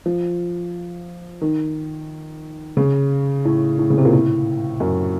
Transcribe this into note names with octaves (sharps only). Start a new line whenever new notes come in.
F3
D#3
C#3
A2
A2
C#3
C3
A#2
A2
F#2